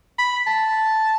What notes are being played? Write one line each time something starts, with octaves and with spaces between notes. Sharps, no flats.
B5
A5